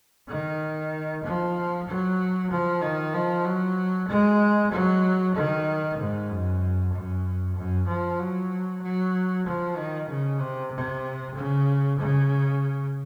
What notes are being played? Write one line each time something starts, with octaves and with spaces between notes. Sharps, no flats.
D#3
F3
F#3
F3
D#3
F3
F#3
G#3
F#3
D#3
G#2
F#2
F#2
F#2
F3
F#3
F#3
F3
D#3
C#3
C3
C3
C#3
C#3